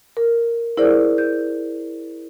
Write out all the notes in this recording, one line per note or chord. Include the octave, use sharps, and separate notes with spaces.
A#4
E4 G#4 A#4 C5 D5
G6